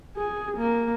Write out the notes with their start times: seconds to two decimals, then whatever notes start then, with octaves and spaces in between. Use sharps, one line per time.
0.17 G#4
0.57 A#3